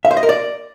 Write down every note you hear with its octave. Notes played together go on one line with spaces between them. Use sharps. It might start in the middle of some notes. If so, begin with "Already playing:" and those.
E5
C5
D#5
A#4
D5